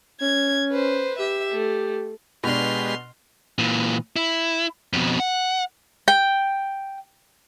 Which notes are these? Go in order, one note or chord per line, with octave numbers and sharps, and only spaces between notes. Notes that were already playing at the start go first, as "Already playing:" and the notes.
C#4 G#6
B4 C5
G4 E5
A3
B2 G#3 D4 G4 B4 C6 F6
A#2 E3
E4
F2 B2
F#5
G5